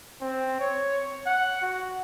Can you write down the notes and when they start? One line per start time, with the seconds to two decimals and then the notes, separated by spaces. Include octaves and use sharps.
0.21 C4
0.60 C#5
1.26 F#5
1.62 F#4